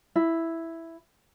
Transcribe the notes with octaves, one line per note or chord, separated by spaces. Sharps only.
E4